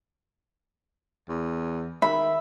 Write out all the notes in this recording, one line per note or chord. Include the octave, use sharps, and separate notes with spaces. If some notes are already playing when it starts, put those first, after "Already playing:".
E2
D#3 E5 B5